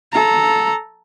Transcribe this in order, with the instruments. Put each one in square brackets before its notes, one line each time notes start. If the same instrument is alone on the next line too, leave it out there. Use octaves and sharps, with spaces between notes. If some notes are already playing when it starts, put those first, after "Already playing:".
[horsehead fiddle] A4 A#5